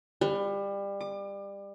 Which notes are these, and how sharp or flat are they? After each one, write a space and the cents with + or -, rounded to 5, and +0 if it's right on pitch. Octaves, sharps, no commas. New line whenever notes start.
G3 +25
D6 +35